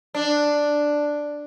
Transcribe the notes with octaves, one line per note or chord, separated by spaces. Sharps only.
D4